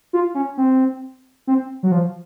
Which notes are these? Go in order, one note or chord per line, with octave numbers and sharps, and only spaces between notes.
F4
C#4
C4
C4
F#3
F3